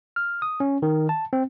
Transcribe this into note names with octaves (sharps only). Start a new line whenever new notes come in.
F6
D#6
C#4
D#3
A5
C4